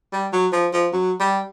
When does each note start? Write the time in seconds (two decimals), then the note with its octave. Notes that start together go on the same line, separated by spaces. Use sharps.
0.13 G3
0.33 F#3
0.53 F3
0.73 F3
0.93 F#3
1.20 G3